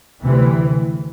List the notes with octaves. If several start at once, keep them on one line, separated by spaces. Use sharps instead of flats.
D2 C3 E3